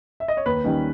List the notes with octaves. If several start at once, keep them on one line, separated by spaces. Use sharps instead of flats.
E5
D#5
C#5
D#2 B4
D#3 G3 C#4